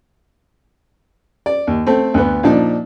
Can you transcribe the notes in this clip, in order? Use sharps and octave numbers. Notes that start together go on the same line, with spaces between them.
D5
D#2
A3 C4
D2 B3
A#2 F3 D4 D#4